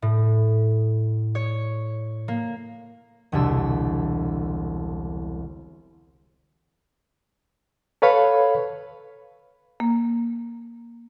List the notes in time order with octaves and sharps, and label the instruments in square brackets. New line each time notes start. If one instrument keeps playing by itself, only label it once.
[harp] A2
C#5
A#3
E1 C2 D3 D4 E6
[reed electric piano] A4 B4 C#5 F5 B5
[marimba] A#3